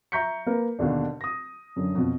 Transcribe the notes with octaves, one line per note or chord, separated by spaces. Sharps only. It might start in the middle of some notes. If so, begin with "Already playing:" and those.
E5 A#5 C#6 G6 B6 C#7
A#3 A#4 B4
D#2 B2 D3 D4
D#6 A#6
F#2 D3
F2 B2